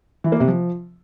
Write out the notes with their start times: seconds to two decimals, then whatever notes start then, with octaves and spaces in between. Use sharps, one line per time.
0.24 E3
0.32 A#3
0.40 C3
0.48 F3